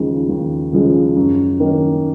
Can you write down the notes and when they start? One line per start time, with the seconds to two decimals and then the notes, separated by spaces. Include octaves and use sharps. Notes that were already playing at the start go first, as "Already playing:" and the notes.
Already playing: D#2 C#3 F3 G#3
0.29 D#2
0.72 C#3 F3 G#3
1.16 F#2
1.60 D#3 A#3 C#4